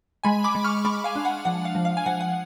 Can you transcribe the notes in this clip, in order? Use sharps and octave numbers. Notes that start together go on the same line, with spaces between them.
G#3 G#5 B5
B5 D6
G#3
C#6 F6
G#3 B5 D6
F5 G#5
D4
F#5
F3 F#5
F5
F3
F5
G#5
F3 F#5
F#5